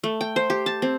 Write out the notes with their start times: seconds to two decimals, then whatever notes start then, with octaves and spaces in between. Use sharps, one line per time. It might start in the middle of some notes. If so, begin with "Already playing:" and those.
0.04 A3
0.21 G5
0.36 C5
0.50 G4
0.66 A5
0.82 C4